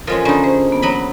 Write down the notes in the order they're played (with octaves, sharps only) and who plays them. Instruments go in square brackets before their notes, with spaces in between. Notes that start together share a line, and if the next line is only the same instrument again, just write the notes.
[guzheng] F3 G#3 C#4 [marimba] F4 A4 A#4
[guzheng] D3 D#4 [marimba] C#4 B5
[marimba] C#4 G#4 C5
A#3 B3
[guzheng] F#3 D#5 B5